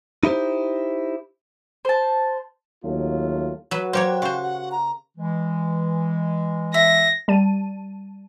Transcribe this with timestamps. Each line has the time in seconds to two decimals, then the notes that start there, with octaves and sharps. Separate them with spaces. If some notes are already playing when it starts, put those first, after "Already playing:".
0.23 D#4 E4 G4 C5
1.85 C5 A5
2.84 D#2 F#3 A3 F4
3.71 F#3 F#4 B4
3.93 F#3 A#3 G4 C5 C#5 G5 C6
4.22 C#3 C5 F5 C6 C#6
4.43 F#5
4.72 A#5
5.17 E3 G#3
6.74 E5 A#6
7.28 G3 D5 A5 D#7